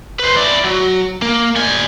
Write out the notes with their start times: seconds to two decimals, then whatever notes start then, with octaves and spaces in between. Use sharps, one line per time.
0.19 B4 C5
0.36 E4 D5
0.65 F#3
1.22 A#3
1.56 G3 G#5